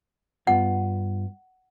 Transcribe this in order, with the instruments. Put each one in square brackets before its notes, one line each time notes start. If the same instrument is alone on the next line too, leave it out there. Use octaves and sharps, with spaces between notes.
[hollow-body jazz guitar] G2 B3 F4 [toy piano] F#5